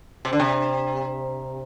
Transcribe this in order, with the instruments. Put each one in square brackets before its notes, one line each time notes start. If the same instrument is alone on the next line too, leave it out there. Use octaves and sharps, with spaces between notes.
[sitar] C3
D3
C3